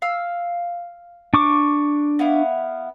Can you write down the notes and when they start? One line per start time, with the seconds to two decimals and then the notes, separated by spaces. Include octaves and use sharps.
0.02 F5 E6 F6
1.34 D4 C#6 D6
2.19 B3 E4 F5